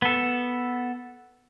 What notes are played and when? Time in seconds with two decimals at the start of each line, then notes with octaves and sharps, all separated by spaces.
0.02 B3 A4